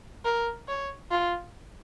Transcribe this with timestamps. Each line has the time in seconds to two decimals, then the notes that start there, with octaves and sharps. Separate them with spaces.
0.25 A#4
0.68 C#5
1.11 F4